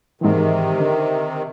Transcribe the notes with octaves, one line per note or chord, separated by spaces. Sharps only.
G#2 C3 D#3 E3
D3